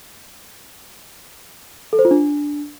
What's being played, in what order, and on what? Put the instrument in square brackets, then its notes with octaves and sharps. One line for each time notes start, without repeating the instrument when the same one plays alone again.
[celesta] A4
C5
F4
D4